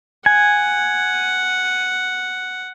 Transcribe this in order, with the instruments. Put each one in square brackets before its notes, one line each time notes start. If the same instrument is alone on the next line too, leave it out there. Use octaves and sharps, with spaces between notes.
[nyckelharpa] F#5 [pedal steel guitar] G#5